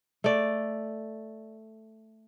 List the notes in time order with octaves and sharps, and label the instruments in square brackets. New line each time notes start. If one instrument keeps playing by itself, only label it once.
[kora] A3 D5